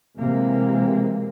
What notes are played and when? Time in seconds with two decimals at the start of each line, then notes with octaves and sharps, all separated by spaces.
0.17 C3 E3 G#3 A#3